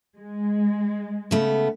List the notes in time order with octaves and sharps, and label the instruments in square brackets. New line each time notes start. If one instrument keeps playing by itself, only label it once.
[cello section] G#3
[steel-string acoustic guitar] C#3 A3 B3